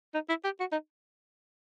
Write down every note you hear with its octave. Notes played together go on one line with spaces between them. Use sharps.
D#4
E4
G4
F#4
D#4